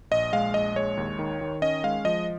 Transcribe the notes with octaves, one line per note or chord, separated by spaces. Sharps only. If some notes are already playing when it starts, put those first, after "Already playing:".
A#1 D#5
G#3 F5
A#1 D#5
G#3 C#5
D#2
D#3
D#3
C#4 D#5
G#3 F5
F3 D#5